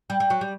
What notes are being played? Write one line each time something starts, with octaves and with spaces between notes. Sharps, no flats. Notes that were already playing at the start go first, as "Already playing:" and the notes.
G3
G3
F#3
G3